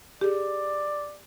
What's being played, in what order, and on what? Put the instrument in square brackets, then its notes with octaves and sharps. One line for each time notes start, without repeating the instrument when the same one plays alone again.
[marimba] G4 G#4 [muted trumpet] D5